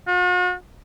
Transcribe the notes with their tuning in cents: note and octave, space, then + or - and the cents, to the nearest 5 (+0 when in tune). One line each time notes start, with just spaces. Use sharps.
F#4 -45